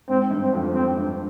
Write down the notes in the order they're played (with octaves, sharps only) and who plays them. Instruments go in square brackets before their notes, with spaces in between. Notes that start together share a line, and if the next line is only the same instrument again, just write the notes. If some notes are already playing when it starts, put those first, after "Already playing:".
[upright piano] G#2 [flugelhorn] C4
[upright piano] G2
[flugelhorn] C4
[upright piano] F2
[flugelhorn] C4
[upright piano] G2